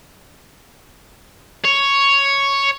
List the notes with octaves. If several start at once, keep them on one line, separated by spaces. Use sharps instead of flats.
C#5